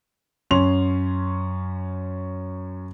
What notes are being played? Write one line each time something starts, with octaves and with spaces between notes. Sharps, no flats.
F#2 C#4 C6 F7